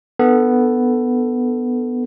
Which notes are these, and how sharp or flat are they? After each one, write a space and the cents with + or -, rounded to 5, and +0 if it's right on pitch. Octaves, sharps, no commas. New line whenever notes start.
B3 +5 D4 +30 A4 +10